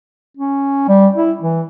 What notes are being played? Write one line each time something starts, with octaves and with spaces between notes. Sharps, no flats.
C#4
G3
E4
E3